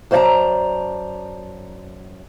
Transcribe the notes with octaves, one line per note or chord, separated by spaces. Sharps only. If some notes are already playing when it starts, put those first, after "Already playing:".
F#2 C5 D5 F5 A5 A#5